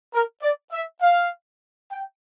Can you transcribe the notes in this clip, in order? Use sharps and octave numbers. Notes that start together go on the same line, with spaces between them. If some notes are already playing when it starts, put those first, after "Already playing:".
A#4
D5
E5
F5
G5